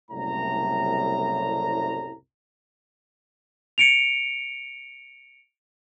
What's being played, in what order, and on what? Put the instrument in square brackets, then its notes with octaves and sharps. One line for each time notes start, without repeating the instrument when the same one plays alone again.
[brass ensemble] F#1 C2 A2 A#5
[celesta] C#7 D7 F7